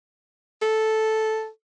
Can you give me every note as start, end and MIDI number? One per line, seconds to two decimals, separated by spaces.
0.62 1.48 69